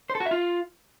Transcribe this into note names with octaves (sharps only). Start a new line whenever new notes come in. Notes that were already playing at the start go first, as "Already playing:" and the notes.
C5
A4
F#4
E5
F4